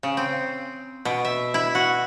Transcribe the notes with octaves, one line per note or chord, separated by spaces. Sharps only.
C#3
C4
B2
E5
E4
F#4